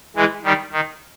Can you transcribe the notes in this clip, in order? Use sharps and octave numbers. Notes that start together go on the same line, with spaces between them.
E3 G#3
D#3 G3
D#3